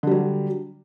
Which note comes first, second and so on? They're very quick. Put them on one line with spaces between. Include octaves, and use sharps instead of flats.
D3 G3 F#3